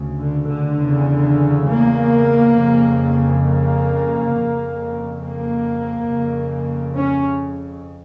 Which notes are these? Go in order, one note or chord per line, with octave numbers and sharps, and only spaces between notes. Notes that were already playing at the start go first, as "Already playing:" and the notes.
Already playing: D2 C#3
D3
D3
E2 C#3
A#3
F2 C#3
A#3
F2 C#3
A#3
F2 C#3
C#4